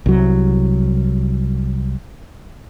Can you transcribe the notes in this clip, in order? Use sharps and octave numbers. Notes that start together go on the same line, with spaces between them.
C2 F#3